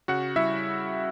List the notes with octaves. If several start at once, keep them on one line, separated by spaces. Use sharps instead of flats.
C#3 F#4 F#5
G3 E4 E5